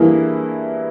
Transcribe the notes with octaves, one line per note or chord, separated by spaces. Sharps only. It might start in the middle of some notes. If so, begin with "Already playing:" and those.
Already playing: G2 E3 A#3 E4 G#4